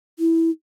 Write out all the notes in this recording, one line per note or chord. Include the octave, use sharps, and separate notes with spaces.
E4